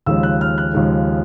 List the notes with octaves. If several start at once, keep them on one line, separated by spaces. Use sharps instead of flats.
D#2 C#3 F3 G#3 E6
F#6
F6
F#6
D#2 C#3 F3 G#3